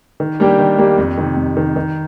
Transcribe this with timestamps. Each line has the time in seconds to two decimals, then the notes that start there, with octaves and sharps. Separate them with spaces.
0.20 D#3
0.40 G3 A#3 D4 G4
0.59 D#3
0.78 G3 A#3 D4 G4
0.98 F2
1.18 C3 D#3
1.37 F2
1.57 C3 D#3
1.76 D#3